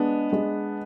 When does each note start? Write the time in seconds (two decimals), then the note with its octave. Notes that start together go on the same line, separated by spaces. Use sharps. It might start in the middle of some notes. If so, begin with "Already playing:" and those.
Already playing: G#3 B3 D4
0.33 G#3